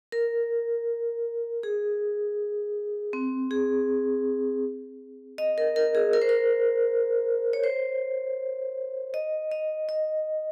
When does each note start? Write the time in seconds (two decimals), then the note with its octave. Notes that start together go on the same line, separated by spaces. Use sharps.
0.12 A#4
1.63 G#4
3.13 C4
3.51 G#4
5.38 D#5
5.58 A#4
5.76 A#4
5.95 G#4
6.13 A#4
6.22 C5
6.29 A#4
7.53 C#5
7.64 C5
9.14 D#5
9.52 D#5
9.89 D#5